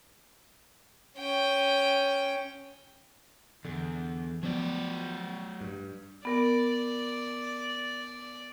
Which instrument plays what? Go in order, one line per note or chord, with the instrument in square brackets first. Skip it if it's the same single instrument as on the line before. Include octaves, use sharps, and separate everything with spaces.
[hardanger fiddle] C#4 G5
[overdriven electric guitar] E2 [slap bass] D3
[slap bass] F3 B3 [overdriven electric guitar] F#3 D5
[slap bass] G2
[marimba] B3 A#4 [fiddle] D5